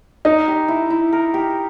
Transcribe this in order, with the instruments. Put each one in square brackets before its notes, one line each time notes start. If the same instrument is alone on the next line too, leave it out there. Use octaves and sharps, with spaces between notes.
[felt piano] D#4 [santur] A#4
[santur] G4
E4
E4
A#4
G4